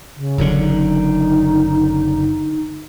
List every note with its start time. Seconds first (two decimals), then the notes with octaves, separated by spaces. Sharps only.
0.16 C#3
0.38 F#1 F#2 D3
0.58 D#4